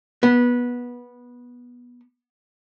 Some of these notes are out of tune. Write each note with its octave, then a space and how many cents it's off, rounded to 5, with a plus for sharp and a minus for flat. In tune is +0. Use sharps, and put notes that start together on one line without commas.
B3 -15